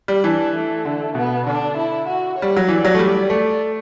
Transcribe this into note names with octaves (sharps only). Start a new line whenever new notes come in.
G3
E3 D4
A3
D3
B2 B3
D3 D4
E4
F#4
G3 C#5
F#3
E3 D5
F#3
A3
G3
A3 D5